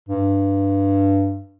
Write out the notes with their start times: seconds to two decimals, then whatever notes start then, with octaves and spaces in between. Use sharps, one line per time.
0.08 G2